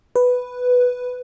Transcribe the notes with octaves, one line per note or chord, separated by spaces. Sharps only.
B4